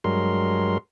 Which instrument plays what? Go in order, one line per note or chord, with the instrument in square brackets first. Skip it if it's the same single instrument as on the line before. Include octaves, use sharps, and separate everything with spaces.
[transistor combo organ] G2 F#3 G#3 A#4 C6